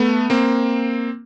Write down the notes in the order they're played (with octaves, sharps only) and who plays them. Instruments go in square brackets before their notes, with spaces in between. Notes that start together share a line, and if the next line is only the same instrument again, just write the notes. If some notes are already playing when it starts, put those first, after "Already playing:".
Already playing: [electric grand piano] A3 B3
A#3 C4